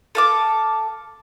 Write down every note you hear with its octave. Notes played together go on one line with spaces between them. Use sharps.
A4 F5 D6